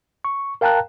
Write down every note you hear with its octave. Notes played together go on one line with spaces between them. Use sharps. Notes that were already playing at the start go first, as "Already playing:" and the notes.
C#6
A#4 F5 G5 A5 A#5 F#6